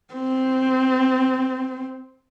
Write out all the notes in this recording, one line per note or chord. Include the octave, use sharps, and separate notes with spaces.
C4